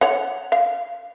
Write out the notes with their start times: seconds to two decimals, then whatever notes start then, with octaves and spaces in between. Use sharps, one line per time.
0.01 C#5 F#5
0.52 F5